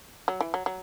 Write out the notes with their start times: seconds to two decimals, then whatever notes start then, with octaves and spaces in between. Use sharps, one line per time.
0.28 F#3
0.41 E3
0.54 F#3
0.66 F#3